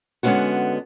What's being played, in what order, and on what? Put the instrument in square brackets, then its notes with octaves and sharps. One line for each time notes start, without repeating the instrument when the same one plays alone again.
[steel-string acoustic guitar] D3 G#3 B3 C#4 F4 F#4